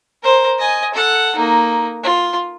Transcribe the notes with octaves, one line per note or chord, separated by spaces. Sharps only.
A#4 C5
D#5 G#5
A4 F#5
A#3 D#4
F4